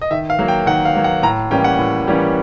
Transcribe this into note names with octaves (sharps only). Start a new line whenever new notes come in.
D#5
D#3 E5
F5
F#3 A#3
G5
D#3 F#5
F5
F#3 A#3
F#5
A2 A#5
E3 G3 A#3 C#4 G5
F#5
A2
E3 G3 A#3 C#4